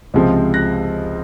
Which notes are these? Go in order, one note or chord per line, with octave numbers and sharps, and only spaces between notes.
C#2 C3 F3 G#3 C4
F#6 A#6